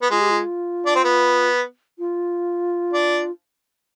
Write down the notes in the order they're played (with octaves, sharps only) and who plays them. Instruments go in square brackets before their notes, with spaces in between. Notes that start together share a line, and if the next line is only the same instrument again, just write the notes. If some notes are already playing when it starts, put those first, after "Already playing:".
[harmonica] B3
[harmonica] G#3 [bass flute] F4
[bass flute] G4
F4
[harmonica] D4
C4
B3
[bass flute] F4
[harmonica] D4